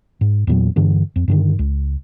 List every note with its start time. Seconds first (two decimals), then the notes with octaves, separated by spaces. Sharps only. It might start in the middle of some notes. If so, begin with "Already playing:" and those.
0.21 G#2
0.47 E2 A#2 F#3
0.76 G2 D3 E3
1.16 F2
1.28 G2 D3 D#3
1.59 C#2